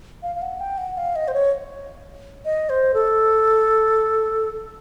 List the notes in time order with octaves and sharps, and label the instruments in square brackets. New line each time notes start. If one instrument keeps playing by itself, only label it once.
[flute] F5
F5
F#5
G5
F#5
F5
D#5
C5
C#5
D#5
C5
A4